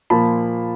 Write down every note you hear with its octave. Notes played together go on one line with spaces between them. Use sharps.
A#2 F3 A#3 A5 B5